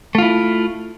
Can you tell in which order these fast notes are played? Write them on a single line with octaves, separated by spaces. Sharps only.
A3 F4 E4